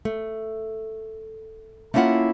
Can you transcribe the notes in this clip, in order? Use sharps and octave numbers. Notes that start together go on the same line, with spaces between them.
A3
A3 A#3 C#4 E4 F4 F#5